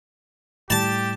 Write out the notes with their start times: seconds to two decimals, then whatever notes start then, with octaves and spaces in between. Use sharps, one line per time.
0.70 A2 G3 G4 A5